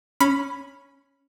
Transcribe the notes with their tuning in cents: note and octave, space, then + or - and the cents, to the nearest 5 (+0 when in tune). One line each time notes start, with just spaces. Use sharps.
C#4 +0 B5 +0